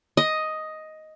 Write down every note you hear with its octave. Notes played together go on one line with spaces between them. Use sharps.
D#5